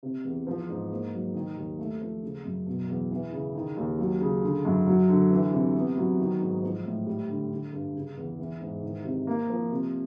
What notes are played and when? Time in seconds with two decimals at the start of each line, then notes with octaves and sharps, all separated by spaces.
0.03 C3
0.25 E2
0.47 F3
0.69 G#2
0.91 A#3
1.13 F#3
1.34 D#3
1.57 D#2
1.79 A3
2.01 F3
2.23 C#3
2.44 F#2
2.66 B2
2.88 E2
3.11 E3
3.32 C#3
3.55 D#3
3.77 D#2
3.99 F#3
4.21 C#3
4.43 D3
4.65 F#2
4.87 F#3
5.09 D3
5.31 E3
5.53 C3
5.75 B3
5.97 F#3
6.19 D#3
6.41 G#2
6.63 F3
6.85 A2
7.07 G3
7.29 D3
7.51 D3
7.73 G2
7.95 C#3
8.17 E2
8.39 E3
8.61 G#2
8.83 D#3
9.05 C3
9.27 A#3
9.49 F3
9.71 C3